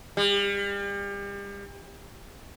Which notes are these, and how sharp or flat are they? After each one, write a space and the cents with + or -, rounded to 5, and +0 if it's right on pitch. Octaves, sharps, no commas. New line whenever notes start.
G3 +35